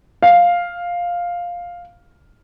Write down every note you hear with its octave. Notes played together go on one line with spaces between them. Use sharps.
F5